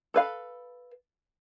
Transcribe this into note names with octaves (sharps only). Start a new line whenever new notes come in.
A4 B4 F5